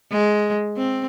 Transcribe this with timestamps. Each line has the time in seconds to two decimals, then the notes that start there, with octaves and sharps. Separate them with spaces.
0.11 G#3
0.77 C4